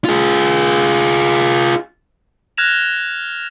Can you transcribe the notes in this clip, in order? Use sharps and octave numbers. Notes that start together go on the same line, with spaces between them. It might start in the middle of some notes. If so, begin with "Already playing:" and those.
F4 G#4
F6 F#6 G#6 A#6 E7 F7